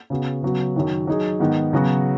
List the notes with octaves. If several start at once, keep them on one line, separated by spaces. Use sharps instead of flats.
C#3 B3 F#4
C#3 F#3 B3 F#4
F#2 D#3 F#3
F#3 D#4 G#4
G#2 D#3 B3 D#4
C#3 F#3 B3 F#4